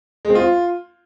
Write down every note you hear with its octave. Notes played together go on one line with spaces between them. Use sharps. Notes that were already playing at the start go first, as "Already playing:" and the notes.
G#3
C4
F4